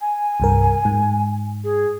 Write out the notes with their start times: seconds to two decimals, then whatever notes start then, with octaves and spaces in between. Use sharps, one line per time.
0.01 G#5
0.40 C2 G2 A#4
0.85 G#2
1.64 G#4